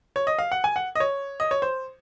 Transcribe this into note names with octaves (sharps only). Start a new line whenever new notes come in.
C#5
D#5
F5
F#5
G#5
F#5
D#5
C#5
D#5
C#5
C5